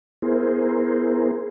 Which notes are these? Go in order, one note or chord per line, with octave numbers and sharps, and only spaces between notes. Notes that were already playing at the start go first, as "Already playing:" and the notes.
B3 E4 G#4 A#4 C5